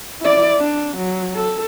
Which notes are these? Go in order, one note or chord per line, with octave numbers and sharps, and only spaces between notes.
E4 D5
D4
F#3
A4